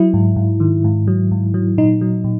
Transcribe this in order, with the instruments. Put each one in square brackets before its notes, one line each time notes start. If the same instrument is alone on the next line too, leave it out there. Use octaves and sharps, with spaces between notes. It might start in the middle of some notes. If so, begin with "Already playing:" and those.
Already playing: [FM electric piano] F#3 E4
G#2
G#2
D#3
G#2
F#3
G#2
F#3
A#2 D#4
F#3
A#2